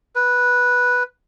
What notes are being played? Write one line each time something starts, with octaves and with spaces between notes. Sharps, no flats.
B4